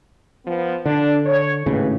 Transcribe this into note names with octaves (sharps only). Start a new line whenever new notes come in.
F3 B3
D3 D4
C#5
G#1 D#2 A2 C#3 B4